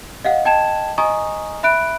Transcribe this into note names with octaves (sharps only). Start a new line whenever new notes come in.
D#5 F5 F#5
D#5 G5 A5 G#6 E7
D#5 G#5 A#5 C#6 D#6
E5 B5 F#6 D7